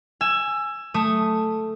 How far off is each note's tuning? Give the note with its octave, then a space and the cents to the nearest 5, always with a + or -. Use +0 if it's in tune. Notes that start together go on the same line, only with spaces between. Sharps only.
G#5 +0 E6 +20
A3 +0 D#6 +0